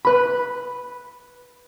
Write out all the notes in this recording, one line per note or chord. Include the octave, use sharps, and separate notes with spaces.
B4 B5